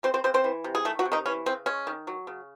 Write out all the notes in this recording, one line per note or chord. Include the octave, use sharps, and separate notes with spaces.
G#3 C4 C5
C4 C5
C#3 C4 C5
C4 C5
E3
C3
G#4
D#3 A3 A4
F#3 F#4
C3
D#3 D#4
E3 C#4
C#3 C4
G#3 C#4
D#3
F#3
C#3